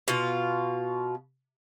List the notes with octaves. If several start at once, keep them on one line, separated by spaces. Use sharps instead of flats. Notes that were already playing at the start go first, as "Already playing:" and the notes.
B2 F4